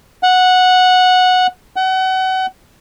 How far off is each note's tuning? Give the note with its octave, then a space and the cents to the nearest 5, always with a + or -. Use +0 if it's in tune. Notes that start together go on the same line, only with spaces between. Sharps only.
F#5 -10
F#5 +30